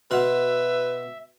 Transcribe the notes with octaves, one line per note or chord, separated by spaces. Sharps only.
B2 F#4 B4 E5 F#5 C6